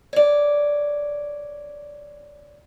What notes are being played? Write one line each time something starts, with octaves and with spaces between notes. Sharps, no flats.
C#5 D5